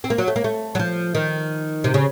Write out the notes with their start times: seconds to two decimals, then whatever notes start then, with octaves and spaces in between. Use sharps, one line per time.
0.04 C4
0.10 A#3
0.18 F#3
0.28 A3
0.36 A#3
0.44 A3
0.75 F#3
0.79 F3
1.15 D#3
1.84 C3
1.94 C#3